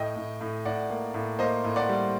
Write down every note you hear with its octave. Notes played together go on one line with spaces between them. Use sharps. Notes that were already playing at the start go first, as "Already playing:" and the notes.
Already playing: A2 D#5 G5
A2
A2
A2 D5 F#5
A#3
A2
A#3 C5 D#5
A2
D5 F#5
G3